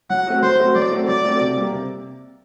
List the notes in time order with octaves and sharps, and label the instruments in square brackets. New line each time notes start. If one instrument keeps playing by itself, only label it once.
[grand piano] F#3 [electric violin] F#5
[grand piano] A3 C4 F#4
[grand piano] F#3 [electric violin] C5
[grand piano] A3 C4 F#4
[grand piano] F#3 [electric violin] D5
[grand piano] A3 C4 F#4
[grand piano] F#3 [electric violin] D5
[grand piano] A3 C4 F#4
C3
G3 A#3
C3